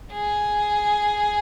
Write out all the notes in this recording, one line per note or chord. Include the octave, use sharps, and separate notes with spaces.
G#4